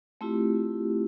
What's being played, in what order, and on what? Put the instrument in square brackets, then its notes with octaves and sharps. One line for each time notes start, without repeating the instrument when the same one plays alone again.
[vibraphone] A3 C4 E4 F4 G4